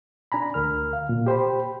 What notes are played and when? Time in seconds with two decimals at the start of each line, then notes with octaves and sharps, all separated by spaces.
0.32 D4 G#5 A#5 B5
0.54 D2 A#4 F6
0.93 F5
1.09 A#2
1.26 G4 C5 G5 B5